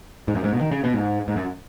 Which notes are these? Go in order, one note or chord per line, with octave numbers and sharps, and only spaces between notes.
G#2
F#2
G#2
B2
D#3
C#3
B2
G#2
G#2
F#2